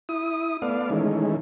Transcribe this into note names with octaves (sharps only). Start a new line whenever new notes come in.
E4 D#6
A3 B3 D5 F5
D#3 E3 G#3 A3 C#4